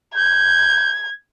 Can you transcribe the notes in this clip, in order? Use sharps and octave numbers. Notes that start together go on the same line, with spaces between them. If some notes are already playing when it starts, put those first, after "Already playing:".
G6 G#6